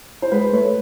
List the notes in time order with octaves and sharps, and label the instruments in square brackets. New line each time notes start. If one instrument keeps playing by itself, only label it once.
[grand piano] C5
[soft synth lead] G#3 [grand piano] B4
[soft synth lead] A3 [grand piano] C#5